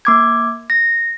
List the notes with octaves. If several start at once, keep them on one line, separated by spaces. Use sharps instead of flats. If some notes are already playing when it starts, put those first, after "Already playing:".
A#3 D6 G#6
A#6